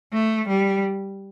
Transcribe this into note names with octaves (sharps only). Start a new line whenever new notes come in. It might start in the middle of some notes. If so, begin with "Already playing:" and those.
A3
G3